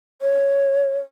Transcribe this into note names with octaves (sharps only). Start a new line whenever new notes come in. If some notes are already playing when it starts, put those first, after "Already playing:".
C#5